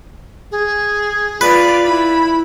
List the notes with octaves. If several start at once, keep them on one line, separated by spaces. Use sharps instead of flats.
G#4
F4 B4 D5
E4 B5